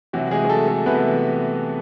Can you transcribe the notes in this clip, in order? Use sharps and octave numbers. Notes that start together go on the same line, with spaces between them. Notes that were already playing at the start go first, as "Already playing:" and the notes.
C3 E3 F#3 F#4
G#3 G#4
G#4
A3 A4
A3 A4
C3 E3 B3 B4